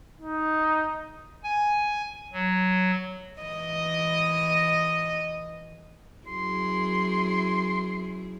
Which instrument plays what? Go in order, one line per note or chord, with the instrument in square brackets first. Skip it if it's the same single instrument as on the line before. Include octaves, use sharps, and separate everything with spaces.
[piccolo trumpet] D#4
[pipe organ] G#5
F#3
[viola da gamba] E3 D#5
[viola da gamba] F#2 E4 G#4 [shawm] C6